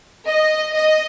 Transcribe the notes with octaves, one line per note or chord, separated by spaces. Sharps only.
D#5
D#5